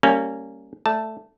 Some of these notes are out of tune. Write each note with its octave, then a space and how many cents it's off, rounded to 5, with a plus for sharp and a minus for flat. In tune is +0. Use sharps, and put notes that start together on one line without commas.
G3 +0 A#3 -25 C#4 +0
A3 +0 D5 +0 A5 +0